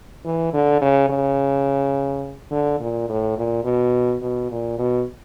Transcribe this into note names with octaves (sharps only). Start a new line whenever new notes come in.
E3
D3
C#3
C#3
D3
A#2
A2
A#2
B2
B2
A#2
B2